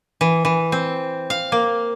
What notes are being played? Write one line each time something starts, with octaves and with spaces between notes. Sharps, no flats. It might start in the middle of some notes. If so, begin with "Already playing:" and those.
E3
E3
C4
F5
A#3